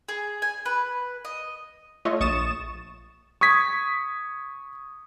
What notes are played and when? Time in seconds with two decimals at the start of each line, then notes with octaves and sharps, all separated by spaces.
0.09 G#4
0.42 G#5
0.65 B4
1.25 D#5
2.05 A3 F4 C#5 D#5
2.20 A#1 C#6 D#6 A6 E7
3.41 C#6 D#6 G#6 B6